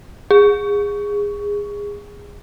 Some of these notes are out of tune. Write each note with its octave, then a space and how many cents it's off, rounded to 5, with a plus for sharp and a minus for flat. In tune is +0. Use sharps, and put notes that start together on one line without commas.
G#4 -20